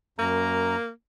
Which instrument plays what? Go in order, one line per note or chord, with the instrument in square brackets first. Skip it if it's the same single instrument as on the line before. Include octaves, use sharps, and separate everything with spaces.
[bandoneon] F#2 A#5 [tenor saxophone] A#3